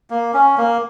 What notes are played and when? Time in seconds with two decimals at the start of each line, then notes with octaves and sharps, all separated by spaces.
0.10 A#3
0.34 C#4
0.58 A#3